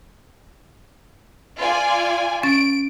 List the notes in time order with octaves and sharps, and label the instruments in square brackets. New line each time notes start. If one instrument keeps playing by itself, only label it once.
[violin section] F4 D5 G#5
[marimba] C#4 A6 [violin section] D7